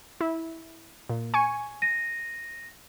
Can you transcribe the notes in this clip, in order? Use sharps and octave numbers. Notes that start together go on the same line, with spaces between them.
E4
A#2
G#5 C#6
A#6 D#7